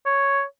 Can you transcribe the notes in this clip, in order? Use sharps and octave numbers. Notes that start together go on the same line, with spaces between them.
C#5